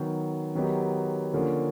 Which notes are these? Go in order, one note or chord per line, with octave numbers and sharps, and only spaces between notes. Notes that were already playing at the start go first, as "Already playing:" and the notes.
Already playing: D#3 F#3 B3
D#3 F#3 B3 D#4 G4
D3 F3 A#3 C#4